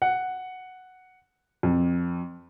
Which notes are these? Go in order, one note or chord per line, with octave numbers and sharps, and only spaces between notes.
F#5
F2